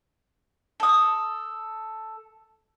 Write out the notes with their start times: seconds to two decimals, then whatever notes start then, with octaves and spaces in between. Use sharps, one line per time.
0.80 A4 D#6